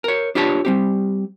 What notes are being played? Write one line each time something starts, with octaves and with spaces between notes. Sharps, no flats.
A#4 C#5
D4 F4 G4 B4 C#5 A5
G3 C4 G4